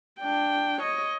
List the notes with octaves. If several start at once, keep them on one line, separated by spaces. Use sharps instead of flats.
D4 G5
C#5 D#5